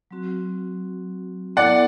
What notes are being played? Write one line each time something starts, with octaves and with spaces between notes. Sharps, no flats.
F#3 C4 F#4
B3 E4 A4 D5 E5 F#5